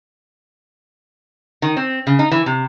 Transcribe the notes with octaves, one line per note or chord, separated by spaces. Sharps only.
D#3
C4
C#3
D#4
E3
C3